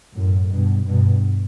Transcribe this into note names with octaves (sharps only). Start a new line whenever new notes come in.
F#2 A2
G2 B2
G2 B2